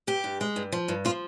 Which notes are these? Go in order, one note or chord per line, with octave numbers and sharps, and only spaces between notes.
G2 G4
G2
G#3
G2
F3
G2
F3 F4